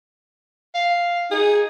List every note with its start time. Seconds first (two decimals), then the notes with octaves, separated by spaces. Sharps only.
0.74 F5
1.31 D#4 G#4